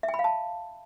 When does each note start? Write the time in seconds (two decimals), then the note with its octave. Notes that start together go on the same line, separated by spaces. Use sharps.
0.03 E5
0.09 G5
0.14 B5
0.19 F5
0.24 A5